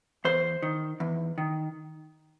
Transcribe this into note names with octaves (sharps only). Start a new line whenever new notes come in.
E2 C5
D#3
E2
D#3